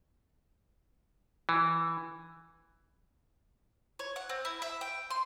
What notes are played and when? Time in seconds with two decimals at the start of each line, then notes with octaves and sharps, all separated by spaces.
1.49 E3
3.99 C#5
4.16 F#5
4.29 C4
4.45 E4
4.62 E5
4.81 G5
5.10 C6